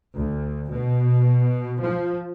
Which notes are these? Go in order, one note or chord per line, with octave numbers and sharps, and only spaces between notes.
D2
B2
F3